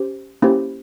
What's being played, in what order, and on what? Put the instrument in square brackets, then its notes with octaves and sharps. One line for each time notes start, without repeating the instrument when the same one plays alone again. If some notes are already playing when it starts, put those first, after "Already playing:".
Already playing: [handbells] C#4 G4 C5
A#3 C#4 E4 G4 C5